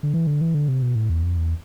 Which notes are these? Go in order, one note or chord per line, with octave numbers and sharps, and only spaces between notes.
D3
E3
D3
E3
D3
C3
B2
A2
E2
F2
E2